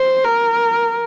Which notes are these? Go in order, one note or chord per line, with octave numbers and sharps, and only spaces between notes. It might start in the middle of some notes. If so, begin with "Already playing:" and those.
Already playing: C5
A#4